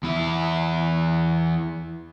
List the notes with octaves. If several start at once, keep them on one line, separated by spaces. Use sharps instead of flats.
E2 E4